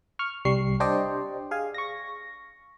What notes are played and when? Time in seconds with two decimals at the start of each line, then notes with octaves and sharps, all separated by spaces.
0.19 C#6 F6
0.45 C2 G3 C#6 C7
0.80 D4 G4 C5 D5 D#5 G5
1.51 G#4 F5 G#5
1.74 C#6 A#6